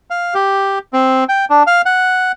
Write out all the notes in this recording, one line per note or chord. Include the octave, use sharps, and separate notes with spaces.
F5
G4
C4
G5
D4
F5
F#5